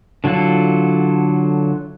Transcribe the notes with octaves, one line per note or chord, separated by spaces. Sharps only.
D3 F#3 E4 F4 A4